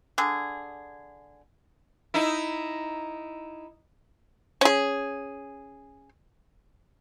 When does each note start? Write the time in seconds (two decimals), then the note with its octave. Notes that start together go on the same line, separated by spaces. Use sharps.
0.18 D3 G#4
2.14 D#4 E4
4.61 C#4 G#4